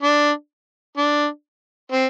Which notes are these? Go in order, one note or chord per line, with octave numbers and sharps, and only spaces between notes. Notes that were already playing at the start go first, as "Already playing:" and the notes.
D4
D4
C4